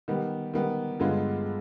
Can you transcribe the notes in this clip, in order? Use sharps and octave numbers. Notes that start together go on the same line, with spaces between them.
D#3 G3 B3
D#3 G3 B3
G2 D3 G#3 B3 F4